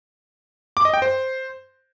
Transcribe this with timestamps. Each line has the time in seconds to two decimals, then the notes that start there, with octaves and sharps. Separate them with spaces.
0.77 D6
0.85 D#5
0.94 G5
1.02 C5